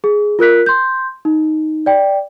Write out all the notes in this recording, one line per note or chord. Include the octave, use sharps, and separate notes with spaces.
G#4
F4 A#4 F#6 B6
C6 G6
D#4
D5 G5